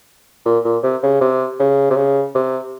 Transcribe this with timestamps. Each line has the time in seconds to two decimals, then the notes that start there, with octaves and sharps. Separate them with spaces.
0.46 A#2
0.65 A#2
0.84 C3
1.03 C#3
1.21 C3
1.59 C#3
1.90 C3
1.97 C#3
2.35 C3